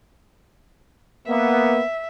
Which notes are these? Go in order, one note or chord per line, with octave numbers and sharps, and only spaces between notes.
A#3 B3 E5